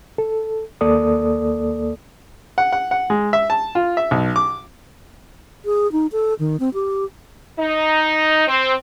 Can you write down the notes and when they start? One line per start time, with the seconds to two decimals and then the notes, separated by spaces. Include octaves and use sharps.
0.18 A4
0.81 D#2 A#3 A4 D5 D#6
2.58 F#5
2.73 F#5
2.91 F#5
3.10 G#3
3.33 E5
3.50 A5
3.75 F4
3.97 E5
4.11 B1
4.36 D6
5.65 G#4
5.92 D#4
6.12 A4
6.39 D#3
6.60 C4
6.74 G4
7.60 D#4
8.47 C4